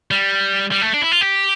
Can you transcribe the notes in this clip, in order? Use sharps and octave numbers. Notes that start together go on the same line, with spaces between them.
G3
G3
A3
D4
E4
F4
G4